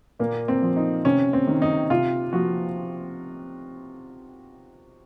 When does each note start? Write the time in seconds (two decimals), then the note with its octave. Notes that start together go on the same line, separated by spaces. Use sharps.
0.19 A#2 A#3
0.48 C4
0.62 F3
0.76 D#4
1.05 C3 C#4
1.33 C4
1.48 D#3
1.62 D#4
1.90 C3 F4
2.33 F3 F#4